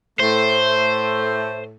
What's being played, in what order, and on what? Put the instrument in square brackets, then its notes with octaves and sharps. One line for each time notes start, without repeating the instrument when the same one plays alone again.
[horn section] A2 A3 [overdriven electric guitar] C5